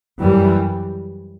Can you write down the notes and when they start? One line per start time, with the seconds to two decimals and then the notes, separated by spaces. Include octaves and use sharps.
0.21 F#2 E3 G3